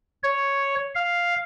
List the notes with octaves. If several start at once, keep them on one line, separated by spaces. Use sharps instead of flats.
C#5
F5